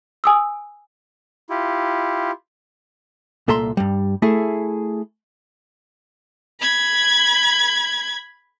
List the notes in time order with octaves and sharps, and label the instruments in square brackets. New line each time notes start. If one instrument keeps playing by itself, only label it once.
[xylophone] G#5 D#6 E6
[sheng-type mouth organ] E4 F4 G4
[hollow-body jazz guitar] C2 A#2 A4 E5 A#5 C6
G2 G3
A3 E4 G#4
[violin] B5 G#6